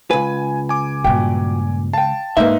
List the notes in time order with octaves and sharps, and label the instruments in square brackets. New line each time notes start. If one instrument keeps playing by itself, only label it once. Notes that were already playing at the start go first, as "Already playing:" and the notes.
[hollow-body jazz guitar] C#2 B4 [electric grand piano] G#5
[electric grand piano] G#5 D6
[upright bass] G2 A#2 [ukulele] F#4 E5 G5
[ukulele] F5 G5 [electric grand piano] A5
[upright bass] G#2 [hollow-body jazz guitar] A#3 E5 [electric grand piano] D#4 [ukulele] B4 C5